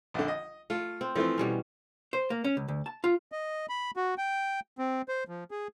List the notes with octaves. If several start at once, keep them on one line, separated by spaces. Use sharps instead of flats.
A#1 D3
D#5
A3 F4
C4
E3 F3 A3 C4
B2 G3 C#4
C5
A#3
C#4
C#2
D2
A5
F4
D#5
B5
F#4
G5
C4
C5
F3
G#4